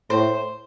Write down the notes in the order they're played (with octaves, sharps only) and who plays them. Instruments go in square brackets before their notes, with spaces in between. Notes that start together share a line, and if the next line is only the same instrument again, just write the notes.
[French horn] A2 [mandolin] C5